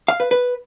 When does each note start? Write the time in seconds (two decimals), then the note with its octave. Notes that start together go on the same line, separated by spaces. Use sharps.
0.08 F5
0.20 B4
0.31 B4